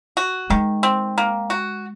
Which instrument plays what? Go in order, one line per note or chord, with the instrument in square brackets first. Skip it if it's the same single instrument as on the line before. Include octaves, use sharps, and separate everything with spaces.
[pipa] F#4
[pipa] D#3 [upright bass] G#3
[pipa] C4
A#3
F#4